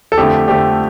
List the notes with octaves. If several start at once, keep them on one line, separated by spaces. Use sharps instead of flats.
A4
F2 D3 A3 G4
F2 D3 A3 G4